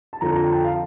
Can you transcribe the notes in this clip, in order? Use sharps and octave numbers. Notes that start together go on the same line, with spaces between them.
A5
F2 D3 F3 A#5
A#5
G5
A5
F5